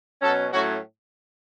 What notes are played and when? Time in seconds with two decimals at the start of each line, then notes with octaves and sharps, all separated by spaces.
0.22 B2 F#3 C#4 A4
0.53 A2 F#3 C#4 F#4